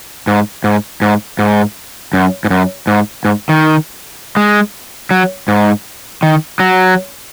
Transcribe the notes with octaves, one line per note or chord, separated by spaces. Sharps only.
G#2
G#2
G#2
G#2
F#2
G#2
F#2
G#2
G#2
D#3
G#3
F#3
G#2
D#3
F#3